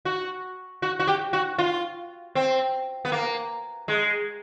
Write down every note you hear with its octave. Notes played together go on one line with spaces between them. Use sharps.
F#4
F#4
F#4
G4
F#4
F4
C4
B3
A#3
G#3